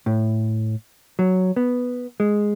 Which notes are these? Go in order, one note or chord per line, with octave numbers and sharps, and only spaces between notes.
A2
F#3
B3
G#3